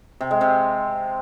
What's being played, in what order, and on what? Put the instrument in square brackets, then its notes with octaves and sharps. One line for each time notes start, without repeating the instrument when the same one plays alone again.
[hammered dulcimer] C3
G#3
C3